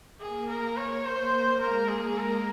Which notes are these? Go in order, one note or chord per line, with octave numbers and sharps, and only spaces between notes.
A#3 G#4
A#4
C#5
A#3 C5
G#3 A#4
A#3 G#4
G#3 A#4